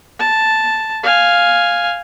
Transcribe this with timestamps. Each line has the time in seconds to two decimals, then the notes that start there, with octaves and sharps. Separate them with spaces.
0.19 A5
1.03 F5 G#5